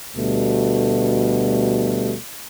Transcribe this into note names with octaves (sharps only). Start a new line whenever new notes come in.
D2 B2 G3 A3